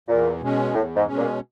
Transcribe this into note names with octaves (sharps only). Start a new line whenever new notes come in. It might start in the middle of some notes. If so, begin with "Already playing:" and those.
E2 A#2
B2 G#3 C#4
E2 A2
G#2
B2 G#3 C#4
A#2